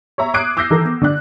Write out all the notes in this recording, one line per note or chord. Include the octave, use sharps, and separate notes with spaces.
C#5 E5 A#5
D6 D#6 F#6 G#6 C7 D7
D6 E6 F#6 G6 A#6 C7
D#3 E3 A4 A#4
B3
D3 D5 F#6